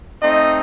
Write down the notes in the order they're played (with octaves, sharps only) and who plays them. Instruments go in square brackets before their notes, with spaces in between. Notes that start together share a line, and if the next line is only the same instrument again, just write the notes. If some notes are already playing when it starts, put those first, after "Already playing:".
[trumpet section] A3 C4 D#4 D#5